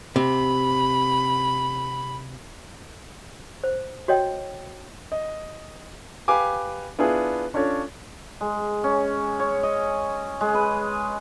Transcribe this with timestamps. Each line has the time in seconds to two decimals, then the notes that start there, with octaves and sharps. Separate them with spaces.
0.16 C3 B5
3.64 C5
4.08 F#4 C#5 D#5 G5
5.12 D#5
6.28 G4 B4 F5 G#5 D6
6.99 B3 D4 E4 F4 G#4
7.54 C#4 D4 F4 A4 C#5
8.41 G#3
8.84 C#4
9.39 C#5
9.63 D#5
10.41 G#3
10.54 B4